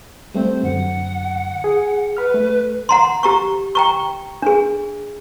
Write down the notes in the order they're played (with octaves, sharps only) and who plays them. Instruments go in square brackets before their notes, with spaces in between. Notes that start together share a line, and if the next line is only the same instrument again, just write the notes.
[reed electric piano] G3 A3 C4 [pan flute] C5
[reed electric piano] F#2 D3 [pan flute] F#5
[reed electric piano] G#4
[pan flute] B4 [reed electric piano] B5 F6
[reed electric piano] A3
[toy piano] F#5 A#5 C6
G4 A#5 C#6
G5 A#5 C#6
D4 G#4